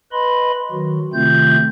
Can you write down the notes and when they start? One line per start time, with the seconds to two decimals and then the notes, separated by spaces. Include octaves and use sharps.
0.12 B4 D#5 B5 C6
0.71 D#3 F#3 F#4
1.13 C3 D#3 A3 C4 F4 G6